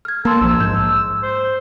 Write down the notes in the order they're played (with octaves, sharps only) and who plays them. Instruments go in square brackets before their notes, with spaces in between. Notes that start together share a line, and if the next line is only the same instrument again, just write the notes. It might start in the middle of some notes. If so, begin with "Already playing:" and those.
[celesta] F6 G#6
[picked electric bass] A#3 [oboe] A4 [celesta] A5 C6 G#6
[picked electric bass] A#1 F3 [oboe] E6
[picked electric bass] G#2 [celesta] G6
[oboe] C5